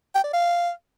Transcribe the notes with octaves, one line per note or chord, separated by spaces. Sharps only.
G5
D5
F5